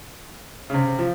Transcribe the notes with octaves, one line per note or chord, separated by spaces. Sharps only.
C#3
C3
F3